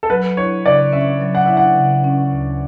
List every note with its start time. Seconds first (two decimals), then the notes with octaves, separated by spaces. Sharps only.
0.03 A4
0.10 F#3 B4
0.37 E4 C#5
0.66 C#3 D5
0.92 C#4 E5
1.21 F#3
1.35 F#5
1.46 E4 E5
1.57 F#5
1.76 C#3
2.04 C#4
2.31 D2